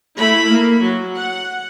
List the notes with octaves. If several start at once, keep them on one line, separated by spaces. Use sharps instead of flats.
A3 E4 B5
A#3
F#3
F#5